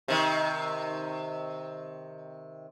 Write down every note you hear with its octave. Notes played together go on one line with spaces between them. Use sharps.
C3 D#3